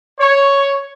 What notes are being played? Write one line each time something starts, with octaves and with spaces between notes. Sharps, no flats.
C#5